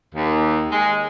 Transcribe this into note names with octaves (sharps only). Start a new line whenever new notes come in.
D#2
G#3